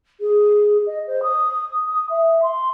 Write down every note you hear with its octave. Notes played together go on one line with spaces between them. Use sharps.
G#4
D#5
C5
D#6
D#6
E5
C6